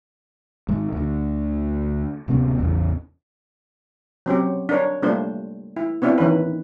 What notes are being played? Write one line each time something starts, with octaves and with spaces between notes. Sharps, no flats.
G#2 D#3
D2 D3
D1 C3 B3 C#4
A1 E2 C#3
F#3 C4 C#4 G4
D4 A#4 C#5
G3 A3 A#3 D4 F4 C5
E4
B3 C4 D4 E4 F4
D#3 E3 C#4 B4